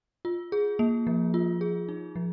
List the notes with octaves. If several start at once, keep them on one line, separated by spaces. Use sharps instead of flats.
F4
G#4
A#3
F3
F4
G#4
D#4
F3